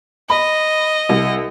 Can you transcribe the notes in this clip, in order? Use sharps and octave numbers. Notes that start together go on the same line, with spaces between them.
D#5 B5
C2